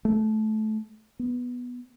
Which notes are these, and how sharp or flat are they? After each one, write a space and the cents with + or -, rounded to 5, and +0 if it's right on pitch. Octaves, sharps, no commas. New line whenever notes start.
A3 -20
B3 -5